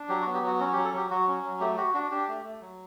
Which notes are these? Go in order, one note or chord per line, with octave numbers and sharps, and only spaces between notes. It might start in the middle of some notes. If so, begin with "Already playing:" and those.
Already playing: D4
F#3 G4
F#4
B3
G4
F#3 F#4
C#4 F#4
G4
F#3
A4
F#3 G4
F#3 F#4
C#4
F#3
A3 G4
F#4 G4
D4 F#4
D4 G4
A3
A3
F#3